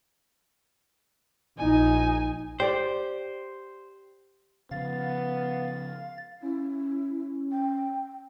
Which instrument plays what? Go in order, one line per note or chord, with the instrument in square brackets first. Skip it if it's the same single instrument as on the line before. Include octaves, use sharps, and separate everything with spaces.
[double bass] A#1 D#4 [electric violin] G#5
[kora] G4 D5 [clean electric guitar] C5
[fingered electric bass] C#3 F3 [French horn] B3 [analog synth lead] F5 [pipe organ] A6
[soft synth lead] C#4 [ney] E4
[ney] G5